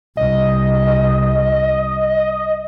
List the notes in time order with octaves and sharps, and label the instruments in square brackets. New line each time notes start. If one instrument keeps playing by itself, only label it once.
[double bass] C2 [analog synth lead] D#5